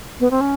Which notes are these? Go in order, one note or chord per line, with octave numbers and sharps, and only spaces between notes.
B3
C4
C#4